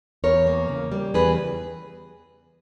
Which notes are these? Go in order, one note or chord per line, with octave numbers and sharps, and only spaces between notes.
E2 A#4 C#5
A#3
C#3
G3
E2 G#4 B4